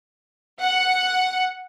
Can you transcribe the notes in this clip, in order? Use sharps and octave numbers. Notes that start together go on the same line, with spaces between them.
F#5